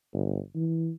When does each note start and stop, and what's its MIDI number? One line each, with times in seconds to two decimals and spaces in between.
0.14 0.39 31
0.55 0.91 52